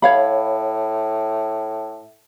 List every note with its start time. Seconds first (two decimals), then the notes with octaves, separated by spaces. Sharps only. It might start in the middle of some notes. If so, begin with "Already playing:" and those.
0.02 A2 C#5 F5 B5